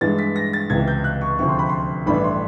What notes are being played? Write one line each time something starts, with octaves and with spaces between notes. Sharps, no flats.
G2 E3 G#3 A6
B6
A#6
A6
C#2 C3 E3 G#6
G6
F#6
C#6
D2 C3 F3 C#6
C6
B5
C6
A1 G2 E3 A3 D4 B5
C6